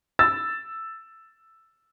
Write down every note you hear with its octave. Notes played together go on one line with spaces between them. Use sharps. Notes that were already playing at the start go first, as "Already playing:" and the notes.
E6 A6